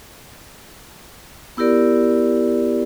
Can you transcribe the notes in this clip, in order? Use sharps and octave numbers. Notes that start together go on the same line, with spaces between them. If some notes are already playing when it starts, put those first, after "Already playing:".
B3 E4 G4 A#4 D5